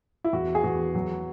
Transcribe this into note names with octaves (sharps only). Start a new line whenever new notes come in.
E4
E2 F#4
G#4
E2 F#4
F#3